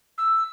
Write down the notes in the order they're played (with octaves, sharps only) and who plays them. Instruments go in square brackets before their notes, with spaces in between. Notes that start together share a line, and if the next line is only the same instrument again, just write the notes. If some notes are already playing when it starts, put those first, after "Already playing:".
[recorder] E6